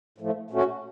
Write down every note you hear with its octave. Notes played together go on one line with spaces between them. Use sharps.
A2 F3 A3
A#2 A3 C#4 F#4